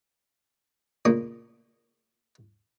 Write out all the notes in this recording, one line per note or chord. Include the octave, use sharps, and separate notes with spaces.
A#2 C#3 A#3 D#6